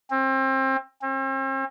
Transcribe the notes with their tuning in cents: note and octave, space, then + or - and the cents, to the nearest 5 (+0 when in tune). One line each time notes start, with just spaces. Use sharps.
C4 +30
C4 +45